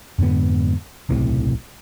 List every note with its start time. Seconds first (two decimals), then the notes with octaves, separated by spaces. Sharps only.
0.19 F2 G#2 D3 B3
1.09 D1 B1 A2 C3